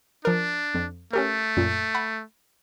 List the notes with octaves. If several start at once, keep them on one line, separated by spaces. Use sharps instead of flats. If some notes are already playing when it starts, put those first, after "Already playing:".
F3 D4 A#4
F2
A3 C#4 G4 A#4
F#2 A#2
F#5 B5